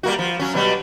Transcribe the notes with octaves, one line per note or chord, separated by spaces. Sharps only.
G3 A#3 F#4
F3
F#3 C#4
B2 F#3 G3